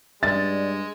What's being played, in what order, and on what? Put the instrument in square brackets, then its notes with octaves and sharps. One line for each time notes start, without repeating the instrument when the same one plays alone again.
[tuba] G2 [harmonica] G#3 [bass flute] D5 [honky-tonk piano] A6